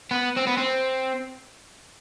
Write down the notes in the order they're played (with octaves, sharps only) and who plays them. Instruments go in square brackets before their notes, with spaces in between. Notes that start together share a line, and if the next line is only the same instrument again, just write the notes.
[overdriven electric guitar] B3
C4
B3
C4